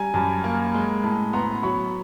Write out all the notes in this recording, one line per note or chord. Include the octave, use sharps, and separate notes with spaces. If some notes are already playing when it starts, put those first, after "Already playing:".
Already playing: G3 G#5 A#5
F#2 A5 B5
A#3
G#3
A2 A5 B5
B3 A#5 C6
F#3 B5 C#6